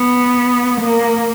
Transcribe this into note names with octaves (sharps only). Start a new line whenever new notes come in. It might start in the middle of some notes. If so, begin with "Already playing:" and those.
Already playing: B3
A#3